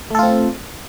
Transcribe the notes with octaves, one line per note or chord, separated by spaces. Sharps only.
A3 C4 F4 A4